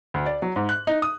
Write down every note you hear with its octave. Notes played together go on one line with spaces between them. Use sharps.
D2
D5
F#3
G#2
F#6
D#4
D#6